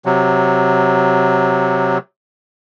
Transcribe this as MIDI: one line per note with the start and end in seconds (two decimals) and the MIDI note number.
0.05 1.98 48
0.05 1.98 54